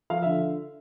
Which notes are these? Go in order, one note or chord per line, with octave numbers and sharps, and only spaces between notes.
F3 F5
D3 E5